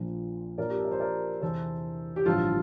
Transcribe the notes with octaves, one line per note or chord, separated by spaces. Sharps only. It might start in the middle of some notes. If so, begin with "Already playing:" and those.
Already playing: A#1 A#2 F3
A#1 A#2 F3 A#4 D5
G4
A4
A#4
C5
A#4 D5
E2 C3 E3 A4 C5
G4
A1 G2 D3 F3 F4 A4